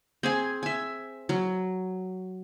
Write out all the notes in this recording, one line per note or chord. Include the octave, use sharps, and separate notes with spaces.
C4 G#4 G#5
E5 G#5
F#3